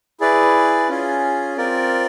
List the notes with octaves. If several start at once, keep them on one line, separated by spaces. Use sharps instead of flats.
E4 G#4 B4 D5
C#4 F4 G#4
C4 F4 A#4 D5